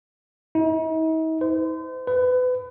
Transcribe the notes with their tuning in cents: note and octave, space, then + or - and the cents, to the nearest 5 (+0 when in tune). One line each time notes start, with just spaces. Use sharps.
D#4 +45
C5 -40
B4 +30